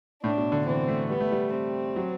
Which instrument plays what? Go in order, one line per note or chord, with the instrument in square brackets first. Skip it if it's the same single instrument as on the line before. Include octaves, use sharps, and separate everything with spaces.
[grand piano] A2 [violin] D4
[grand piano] B2
D3
[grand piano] E3 [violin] C4
[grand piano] A3
[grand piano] G3 [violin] B3
[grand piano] A3
G3
[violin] C4
[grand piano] F#3